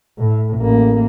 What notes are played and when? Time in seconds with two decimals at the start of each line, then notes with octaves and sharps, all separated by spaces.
0.18 A2
0.58 A1 A#3